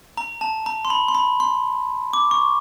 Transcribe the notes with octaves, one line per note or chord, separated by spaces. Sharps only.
A#5
A5
A#5
C6
B5
C6
B5
C6
D6
C#6